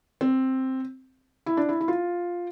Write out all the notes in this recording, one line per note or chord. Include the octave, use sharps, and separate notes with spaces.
C4
E4
D4
E4
E4
F4